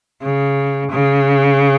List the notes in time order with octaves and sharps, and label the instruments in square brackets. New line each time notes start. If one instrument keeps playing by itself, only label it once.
[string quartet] C#3
C#3